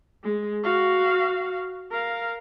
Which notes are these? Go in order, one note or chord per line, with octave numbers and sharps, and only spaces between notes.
G#3
F#4 F5
A#4 F5